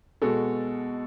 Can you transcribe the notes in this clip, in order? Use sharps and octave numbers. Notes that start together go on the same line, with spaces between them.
B2 G#3 F#4 A4